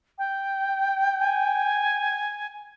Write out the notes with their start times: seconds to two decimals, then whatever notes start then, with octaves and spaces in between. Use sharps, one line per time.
0.19 G5
1.19 G#5